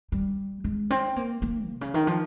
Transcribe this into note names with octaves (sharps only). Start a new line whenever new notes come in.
G3
G#3
C4
A#3
A#3
C3
C#3
D#3
F3